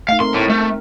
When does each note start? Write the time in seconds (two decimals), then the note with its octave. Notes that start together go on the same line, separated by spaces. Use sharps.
0.09 A3 D#4 F5
0.20 C4 A#4 C6
0.34 A2
0.50 A3